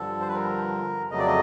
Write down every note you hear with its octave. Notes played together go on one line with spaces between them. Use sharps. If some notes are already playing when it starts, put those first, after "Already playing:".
Already playing: G2 D3 F3 A4
C5
B4
A#4
F2 C#3 F#3 A3 D#5
D5
D#5